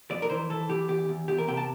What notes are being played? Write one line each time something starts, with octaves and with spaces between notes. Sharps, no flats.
F2 D5
A#4
E3 C5
E3 A4
E3 G4
E2 G4
E2
E2 G4
A#4
C3 G5
A5